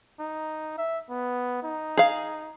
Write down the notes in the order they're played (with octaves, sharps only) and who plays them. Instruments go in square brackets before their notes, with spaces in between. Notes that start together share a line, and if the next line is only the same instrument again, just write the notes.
[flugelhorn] D#4
E5
B3
D#4
[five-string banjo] G#4 F5